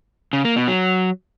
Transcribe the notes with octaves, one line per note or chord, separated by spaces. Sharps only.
C#3
A#3
B2
F#3